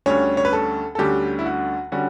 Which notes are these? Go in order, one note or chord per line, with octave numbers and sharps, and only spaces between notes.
D2 D3 G3 C#4 C#5
C#5
B4
A4
A4
D2 D3 G3 C#4 G4
E4
F#4
D3 G3 C#4 F#4